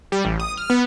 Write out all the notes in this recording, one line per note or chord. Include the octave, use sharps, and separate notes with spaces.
G3
A1
D#6
F6
B3